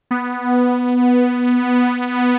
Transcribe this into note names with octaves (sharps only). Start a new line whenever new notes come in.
B3